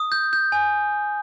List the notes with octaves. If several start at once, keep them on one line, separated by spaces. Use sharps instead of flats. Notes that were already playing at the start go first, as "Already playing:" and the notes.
Already playing: D#6
G6
G6
G#5